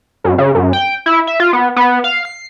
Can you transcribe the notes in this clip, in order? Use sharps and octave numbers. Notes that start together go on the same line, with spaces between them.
F#2
C#3
F#2
G5
E4
E5
F4
B3
B3
F5
C7